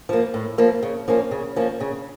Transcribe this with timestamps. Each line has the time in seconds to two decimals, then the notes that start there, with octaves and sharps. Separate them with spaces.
0.09 F3 A#3
0.34 A2
0.58 F3 A#3
0.83 C#3
1.08 F3 A#3 C#4
1.31 C#3
1.56 F3 A#3 C#4
1.81 C#3